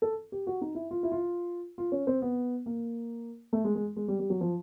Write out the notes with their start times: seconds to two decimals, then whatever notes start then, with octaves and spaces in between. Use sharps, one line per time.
0.02 A4
0.32 G4
0.47 F#4
0.61 D#4
0.75 E4
0.91 F4
1.03 E4
1.11 F4
1.78 F4
1.92 C#4
2.07 C4
2.22 B3
2.66 A#3
3.53 A3
3.65 G#3
3.75 G#3
3.97 G#3
4.08 G3
4.19 G3
4.30 F#3
4.41 F3